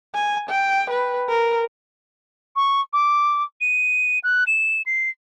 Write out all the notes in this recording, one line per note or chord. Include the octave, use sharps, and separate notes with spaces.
G#5
G5
B4
A#4
C#6
D6
D#7
F#6
E7
C7